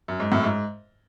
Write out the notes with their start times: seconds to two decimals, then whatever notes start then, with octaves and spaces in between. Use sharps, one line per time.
0.08 F#2
0.20 G#2
0.32 F#2 A2
0.43 G#2